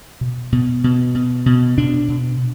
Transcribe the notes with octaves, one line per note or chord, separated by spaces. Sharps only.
B2
B2
B2
B2
B2
B2 D4
B2